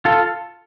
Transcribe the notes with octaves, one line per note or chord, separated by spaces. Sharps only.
F4 A4